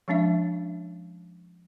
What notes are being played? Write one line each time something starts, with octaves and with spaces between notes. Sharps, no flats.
F3 G#3 C#4 D4 E5